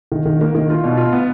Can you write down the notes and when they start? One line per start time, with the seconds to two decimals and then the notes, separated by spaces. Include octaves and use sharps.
0.12 D#3
0.26 D#3
0.41 A#3
0.55 D#3
0.70 F4
0.84 B2
0.97 F4
1.13 B3